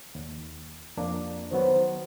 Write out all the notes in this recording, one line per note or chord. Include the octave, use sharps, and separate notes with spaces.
D#2
F2 A#3 D4
D#3 F#3 B3 C5